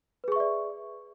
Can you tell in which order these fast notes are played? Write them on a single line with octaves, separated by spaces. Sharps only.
B4 G#4 C#6 E5 D5